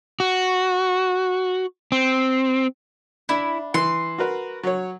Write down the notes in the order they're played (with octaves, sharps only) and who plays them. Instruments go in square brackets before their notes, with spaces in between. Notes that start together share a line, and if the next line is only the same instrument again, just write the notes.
[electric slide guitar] F#4
C4
[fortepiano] D4 [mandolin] E4
[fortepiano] E3 [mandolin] C6
[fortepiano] F#4 A#4 B4
F#3 C#5